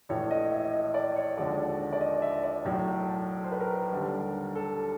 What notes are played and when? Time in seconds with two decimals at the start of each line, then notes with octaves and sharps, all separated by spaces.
0.09 A#1 A2 E3 C#5
0.31 D#5
0.51 E5
0.74 D#5
0.94 D5
1.16 C#5
1.37 D#2 D3 F3 G#3 D5
1.93 D5
2.01 D#5
2.22 E5
2.43 D5
2.64 B1 A2 F#3 A3
3.44 C5
3.52 B4
3.61 A#4
3.92 D#2 D3 G3
4.55 A4